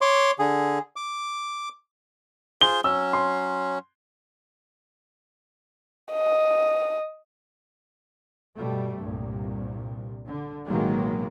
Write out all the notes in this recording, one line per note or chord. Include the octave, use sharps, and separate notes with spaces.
C#5 C6 D6
D3 G#4
D6
F4 G#4 C5 G7
F#3 C#4 E6
C6
D#5
G2 B2 G3 A3
C2 G2 A#2
D3
A1 B2 D#3 F#3 G#3 A#3